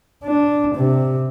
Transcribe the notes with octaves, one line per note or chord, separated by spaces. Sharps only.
D4
C3